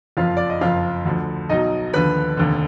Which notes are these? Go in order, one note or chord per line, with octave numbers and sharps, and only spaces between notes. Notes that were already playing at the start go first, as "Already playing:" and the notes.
F#1 F2 F3 F4 F5
D5
D#5
F#1 F2 F3 F4 F5
D2 D3 F3
B1 B2 F#3 D#4 D#5
D#2 D3 F3 B4 B5
F1 D#2 D3